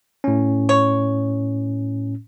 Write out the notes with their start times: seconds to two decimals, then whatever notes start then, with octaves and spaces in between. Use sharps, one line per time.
0.24 A2 C#4
0.69 C#5